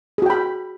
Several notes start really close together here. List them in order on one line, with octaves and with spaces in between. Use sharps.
G#4 F#4 G5 B5